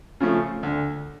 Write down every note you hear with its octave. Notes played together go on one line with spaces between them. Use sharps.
C#3 F3 A3
D2